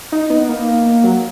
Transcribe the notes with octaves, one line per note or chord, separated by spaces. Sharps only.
D#4
B3
A#3
F#3